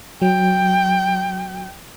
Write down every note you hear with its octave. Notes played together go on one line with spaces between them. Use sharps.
F#3 G5